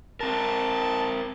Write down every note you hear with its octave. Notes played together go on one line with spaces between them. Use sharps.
C4 A#4 A5